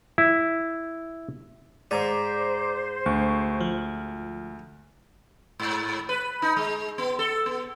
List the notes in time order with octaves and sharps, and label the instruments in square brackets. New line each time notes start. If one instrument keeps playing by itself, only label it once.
[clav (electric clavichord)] E4
[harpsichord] G#2 [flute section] C5 [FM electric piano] D5 A#5 D6
[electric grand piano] D2 [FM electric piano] C#6
[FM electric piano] F3
[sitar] G#2
B4
D#4
G#3
B3
A4
B3